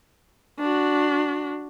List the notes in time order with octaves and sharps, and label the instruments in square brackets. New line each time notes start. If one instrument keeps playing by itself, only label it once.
[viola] D4 F#4